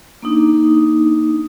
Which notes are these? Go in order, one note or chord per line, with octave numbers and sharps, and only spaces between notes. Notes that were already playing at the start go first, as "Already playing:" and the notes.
A#3 D4 D#4